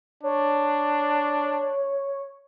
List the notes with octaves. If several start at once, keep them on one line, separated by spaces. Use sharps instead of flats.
D4 C#5